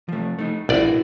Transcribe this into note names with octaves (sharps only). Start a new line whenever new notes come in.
F3 A3
A3 D#4
A#1 E4 F#4 B4 D5